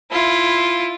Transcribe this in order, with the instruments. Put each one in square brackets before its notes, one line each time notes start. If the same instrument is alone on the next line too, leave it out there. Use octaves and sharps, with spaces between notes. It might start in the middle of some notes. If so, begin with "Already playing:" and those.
[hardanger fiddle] E4 F4